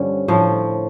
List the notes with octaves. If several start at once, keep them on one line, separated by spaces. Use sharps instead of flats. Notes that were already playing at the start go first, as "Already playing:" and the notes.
Already playing: G2 D3 F3 C#4
A2 F3